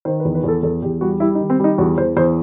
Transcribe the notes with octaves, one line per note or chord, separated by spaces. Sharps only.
D#3 C5
B4
E2
B4
E2 A4
E2 A4
E2 G4
G3 F#4
G3 E4
D#4
D#3
C4
G3 D#4
E2 F#4
E2 C5
E2 C5